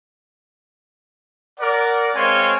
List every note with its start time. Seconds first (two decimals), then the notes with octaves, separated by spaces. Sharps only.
1.60 A#4 D5 F#5
2.15 G#3 C4 C#5 F5 G#5 C6